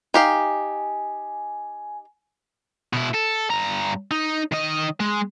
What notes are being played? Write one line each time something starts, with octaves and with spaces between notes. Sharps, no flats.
D#4 G4 F5 G#5
B2 E4
A4
G2 A#5
D#4
D#3 D#5
G#3